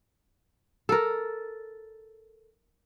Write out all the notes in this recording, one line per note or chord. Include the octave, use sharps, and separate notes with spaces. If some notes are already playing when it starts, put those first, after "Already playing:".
A4 A#4